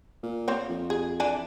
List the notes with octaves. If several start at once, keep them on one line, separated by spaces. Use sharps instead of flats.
A#2
A#3 C4 C#5
F2
G#4
E3 D4 G#5